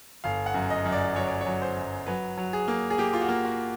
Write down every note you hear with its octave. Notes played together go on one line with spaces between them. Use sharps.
G1 F5
F#5
F#2
D#5
F#2
D5
F#3 C#5
D5
C#5
F#3
C5
F#2
F#3 B4
F#3
G#4
A#3
G#4
A#3 G4
F4
F#4
A#3
F#4